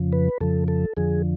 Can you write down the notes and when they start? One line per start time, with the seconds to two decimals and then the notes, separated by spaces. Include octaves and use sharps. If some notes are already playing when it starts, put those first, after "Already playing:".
Already playing: F2 C#3 F3
0.13 B4
0.41 F2 C#3 F3 A4
0.68 A4
0.97 F2 D3 F3 G#4